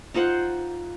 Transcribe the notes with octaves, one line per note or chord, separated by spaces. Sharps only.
D#4 F4 C5 F#5